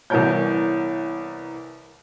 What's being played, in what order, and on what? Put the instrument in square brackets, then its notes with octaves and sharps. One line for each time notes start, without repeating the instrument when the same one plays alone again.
[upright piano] C2 E3 B3 A#4 C#5 G6